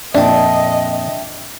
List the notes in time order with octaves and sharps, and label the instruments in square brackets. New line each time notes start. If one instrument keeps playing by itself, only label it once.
[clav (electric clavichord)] F2 A#2 [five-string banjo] D4 [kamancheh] D#5 [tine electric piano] E5 G5